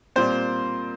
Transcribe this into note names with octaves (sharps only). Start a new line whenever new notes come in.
A#2 G3 C4 C5